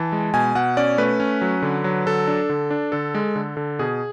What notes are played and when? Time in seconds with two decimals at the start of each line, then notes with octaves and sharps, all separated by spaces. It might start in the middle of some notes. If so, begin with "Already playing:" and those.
Already playing: E3 A5
0.12 G#3
0.34 B2 G#5
0.55 B2 F#5
0.77 C#4 D5
0.98 A3 B4
1.20 C#4
1.42 F#3
1.62 D3
1.84 F#3
2.06 D3 A4
2.28 D4
2.50 D3
2.71 D4
2.92 D3 A4
3.15 G#3
3.36 D3
3.57 D3
3.79 B2 G#4